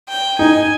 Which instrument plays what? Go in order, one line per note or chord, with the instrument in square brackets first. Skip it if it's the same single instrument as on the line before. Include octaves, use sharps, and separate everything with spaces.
[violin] G5
[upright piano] D#4 [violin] G#5